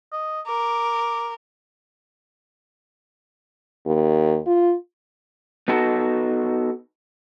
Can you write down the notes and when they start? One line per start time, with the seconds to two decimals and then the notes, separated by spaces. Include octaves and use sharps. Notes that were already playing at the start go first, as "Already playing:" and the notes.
0.12 D#5
0.47 A#4 D6
3.86 D#2
4.46 F4
5.68 B3 D#4 F#4 A4